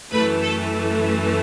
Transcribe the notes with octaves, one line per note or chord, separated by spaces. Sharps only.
F#2 E3 A3 B4
A4